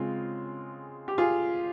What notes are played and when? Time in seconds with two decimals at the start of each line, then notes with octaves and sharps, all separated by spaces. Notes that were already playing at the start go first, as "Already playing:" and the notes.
Already playing: C#3 G#3 C4 F4
1.08 G4
1.18 F4 G#4